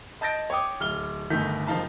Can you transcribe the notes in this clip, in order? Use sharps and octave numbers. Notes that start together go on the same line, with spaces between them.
D#5 A5 G6 A6 A#6 D7
C#5 G5 D6 D#6
D1 F6 G7
G1 D#3 A3 D#4 G6 B6
F#1 F3 D#4 F5 A5